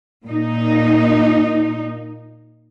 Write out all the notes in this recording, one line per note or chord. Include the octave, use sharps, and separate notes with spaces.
A#2 D#4